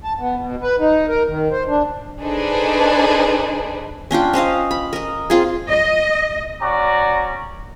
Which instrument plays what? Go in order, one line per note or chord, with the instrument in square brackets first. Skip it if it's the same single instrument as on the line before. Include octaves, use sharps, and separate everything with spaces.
[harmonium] A5
B3
B2
B4
D#4
A#4
D#3
C5
D4
[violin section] D4 D#4 G#4 A4 B4 C5
[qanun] C#4 D4 F4 G5
C#4 C5 D#5 F5
B5
A#4 D#5
C4 F4 G#4
[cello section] D#5
[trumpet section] C#4 F#4 D5 A#5